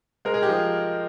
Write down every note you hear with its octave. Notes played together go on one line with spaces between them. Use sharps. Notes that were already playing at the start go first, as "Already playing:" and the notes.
G#3 A#4
G#4
G4
F3